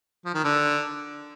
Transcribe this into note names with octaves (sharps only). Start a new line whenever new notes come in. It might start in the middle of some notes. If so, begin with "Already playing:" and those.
F3
D#3
D3